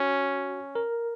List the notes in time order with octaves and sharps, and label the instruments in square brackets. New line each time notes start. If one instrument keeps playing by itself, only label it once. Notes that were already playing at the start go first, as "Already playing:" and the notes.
Already playing: [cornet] C#4 [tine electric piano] F#4
[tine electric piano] A#4